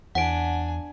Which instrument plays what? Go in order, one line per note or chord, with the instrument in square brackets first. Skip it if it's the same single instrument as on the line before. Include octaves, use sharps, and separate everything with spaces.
[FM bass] E2 [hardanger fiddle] D4 G#5 [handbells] F#5 D7